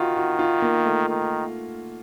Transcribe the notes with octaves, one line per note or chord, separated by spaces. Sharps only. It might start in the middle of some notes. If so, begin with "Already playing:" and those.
Already playing: D#3 F4 F#4
F#4
F4
A#3
A3
D#3